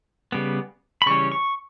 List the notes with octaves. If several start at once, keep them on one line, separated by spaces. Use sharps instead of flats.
C#3 G3 B3
B5
C#3 E3 G3 C#4 C#6
C#6